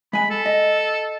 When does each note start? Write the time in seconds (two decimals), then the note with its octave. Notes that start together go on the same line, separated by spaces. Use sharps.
0.13 G#3 G#5 B5
0.30 A4
0.45 D#5